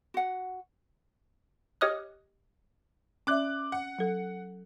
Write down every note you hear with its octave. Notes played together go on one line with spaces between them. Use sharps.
F#4 F#5
G4 C#5 D#5 D#6 F6 F#6
C#4 D5 E5 D6 F#6
F#5
F#3 A4